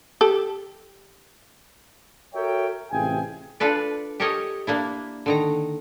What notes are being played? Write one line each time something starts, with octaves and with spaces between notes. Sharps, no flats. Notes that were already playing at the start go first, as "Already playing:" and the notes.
G4 A4
F#4 A4 A#4 C#5 E5 G5
A1 C3 F4 G#4 G5 G#5
D4 F4 A4 B4 D5
G4 A4 A#4 C#5 D#5 G#5
A#3 D4 E4
D3 D#3 A#5